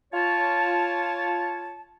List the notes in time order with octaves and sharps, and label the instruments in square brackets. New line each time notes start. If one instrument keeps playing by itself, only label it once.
[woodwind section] F4 C#5 A5